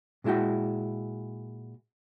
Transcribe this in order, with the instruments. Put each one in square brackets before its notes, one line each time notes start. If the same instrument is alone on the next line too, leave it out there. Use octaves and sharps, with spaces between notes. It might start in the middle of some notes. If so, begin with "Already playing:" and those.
[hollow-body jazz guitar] A#2 G#3 E4 F#4 G5